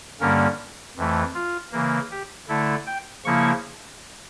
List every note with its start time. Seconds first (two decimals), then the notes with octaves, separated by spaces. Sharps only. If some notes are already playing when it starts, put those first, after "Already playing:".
0.20 G2 D3 G3 A#3 C#4 A#4
0.97 F2 E3 A3
1.34 F4
1.72 C#3 E3 A#3
2.11 G4
2.49 D3 A3 E4 A4
2.87 G5
3.25 C#3 F3 A#3 E4 C#6